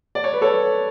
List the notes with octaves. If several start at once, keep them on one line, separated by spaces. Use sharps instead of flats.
D5
C#5
B4
A4 C#5